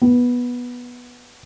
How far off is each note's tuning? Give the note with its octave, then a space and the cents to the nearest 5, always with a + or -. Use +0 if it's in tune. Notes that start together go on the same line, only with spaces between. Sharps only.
B3 -10